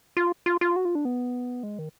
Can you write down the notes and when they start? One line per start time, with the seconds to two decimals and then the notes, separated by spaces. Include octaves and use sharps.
0.17 F4
0.46 F4
0.61 F4
0.76 F#4
0.85 F4
0.95 D4
1.05 B3
1.63 G#3
1.79 D#3